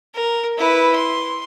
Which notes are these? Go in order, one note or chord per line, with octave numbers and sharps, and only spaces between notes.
A#4
E4 B4
C6